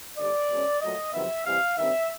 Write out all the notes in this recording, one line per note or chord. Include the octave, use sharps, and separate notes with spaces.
D#2 D3 G3 D5
B2 G#3 C#4
A#2 F#3 A3 D#5
F2 C3 D#3 F#3 B3 E5
C3 E3 G3 F5
G2 D#3 G3 C4 E5